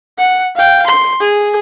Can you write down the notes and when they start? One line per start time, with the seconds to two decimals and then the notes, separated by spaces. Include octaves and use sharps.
0.19 F#5
0.56 F5 G5
0.87 C6
1.20 G#4